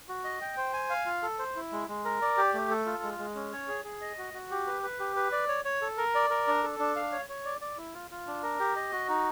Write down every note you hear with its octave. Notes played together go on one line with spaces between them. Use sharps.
F#4
D#5
G5
C5
G#5
F5
F4
A4
C5
E4
G#3
G#3
A#4
D5
G4
A3
A4
F4
G#3
G#3
C#4
C#5
G#4
G#4
D#5
F#4
F#4
G4
B4
B4
G4
B4
D5
C#5
C#5
A4
A#4
D5
A#4
D4
A4
D4
F5
C#5
C#5
D5
D5
E4
F4
F4
D4
A#4
G4
D#5
F#4
D#4